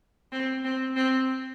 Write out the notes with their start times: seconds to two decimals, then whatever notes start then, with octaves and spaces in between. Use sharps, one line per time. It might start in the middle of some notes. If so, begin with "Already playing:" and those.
0.32 C4
0.64 C4
0.96 C4